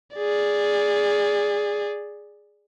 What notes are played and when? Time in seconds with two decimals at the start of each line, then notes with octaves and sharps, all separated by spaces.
0.16 G#4 D5